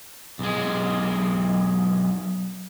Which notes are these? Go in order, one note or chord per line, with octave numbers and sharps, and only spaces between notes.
B1 G#3